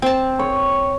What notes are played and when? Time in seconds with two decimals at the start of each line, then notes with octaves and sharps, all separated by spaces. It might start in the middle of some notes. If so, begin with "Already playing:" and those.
0.02 C4 G5 A5
0.39 C#5